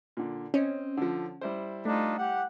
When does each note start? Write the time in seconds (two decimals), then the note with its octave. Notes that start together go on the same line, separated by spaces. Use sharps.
0.17 A#2 D3
0.54 C4 C#4 D#5
0.97 D3 F3
1.41 G3 E4 C5
1.85 A3 D4 D#4 F4
2.18 G4 F#5